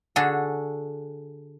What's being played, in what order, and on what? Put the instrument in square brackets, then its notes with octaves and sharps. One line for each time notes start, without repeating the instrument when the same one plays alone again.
[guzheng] D3 D4 F#4 G#4 A4